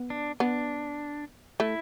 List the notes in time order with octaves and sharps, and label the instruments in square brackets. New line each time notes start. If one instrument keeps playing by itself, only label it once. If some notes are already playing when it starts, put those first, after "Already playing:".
Already playing: [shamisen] B3
[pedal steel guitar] D4
[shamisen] B3 [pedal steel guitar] D4
[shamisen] A3 [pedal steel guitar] E4